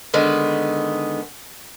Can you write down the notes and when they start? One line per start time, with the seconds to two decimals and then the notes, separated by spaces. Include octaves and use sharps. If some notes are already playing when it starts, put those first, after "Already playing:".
0.14 D3 D#3 G#3 B3